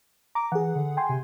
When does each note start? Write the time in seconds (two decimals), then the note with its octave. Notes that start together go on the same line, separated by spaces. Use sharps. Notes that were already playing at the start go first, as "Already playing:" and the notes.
0.35 A#5 D6
0.52 E3 G#4 F#5
0.75 D3
0.97 G5 G#5 C6
1.09 C3